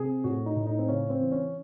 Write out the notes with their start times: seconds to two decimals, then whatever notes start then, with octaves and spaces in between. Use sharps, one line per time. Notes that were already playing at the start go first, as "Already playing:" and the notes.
Already playing: C3 G#4
0.24 A2 F#4
0.46 D#4
0.56 A2
0.66 D#4
0.79 C4
0.88 C#3 C#4
1.10 C4
1.20 E3
1.32 C#4